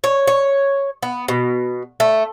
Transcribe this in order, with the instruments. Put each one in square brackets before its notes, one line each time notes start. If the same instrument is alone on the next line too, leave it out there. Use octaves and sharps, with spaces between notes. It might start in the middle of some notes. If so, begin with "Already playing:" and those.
[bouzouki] C#5
C#5
B3
B2
A3